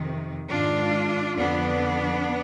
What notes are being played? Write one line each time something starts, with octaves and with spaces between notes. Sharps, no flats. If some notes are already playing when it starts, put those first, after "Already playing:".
Already playing: F2 C3 D#3
G#2 D#3 D4 F4
F2 D3 F3 B3 D4